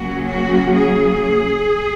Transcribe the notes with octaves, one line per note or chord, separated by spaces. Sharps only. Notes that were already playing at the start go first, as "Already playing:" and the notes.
Already playing: C#3 F#3 A#3 C#4 F#4
F#4
G#4